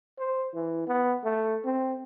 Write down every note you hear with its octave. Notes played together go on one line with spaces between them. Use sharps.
C5
E3
B3
A3
C4